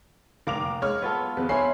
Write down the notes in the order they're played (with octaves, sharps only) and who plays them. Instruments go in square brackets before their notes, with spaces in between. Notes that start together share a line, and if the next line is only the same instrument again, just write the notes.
[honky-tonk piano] F1 D6 F7 [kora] A#3
[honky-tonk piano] G#3 C#5 F6
[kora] B3 F4 A4
[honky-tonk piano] E2 B2 [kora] B4
[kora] C#4 C5 C#5 [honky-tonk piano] E5 B5 C7